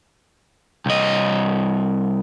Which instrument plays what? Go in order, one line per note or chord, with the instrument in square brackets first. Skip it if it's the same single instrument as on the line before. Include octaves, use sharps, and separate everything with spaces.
[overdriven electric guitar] C2 D#5